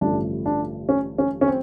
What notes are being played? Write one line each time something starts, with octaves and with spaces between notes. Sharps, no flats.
A1 G2 D3 F3 A3 D4
D4
C#4
C#4
C#4
C4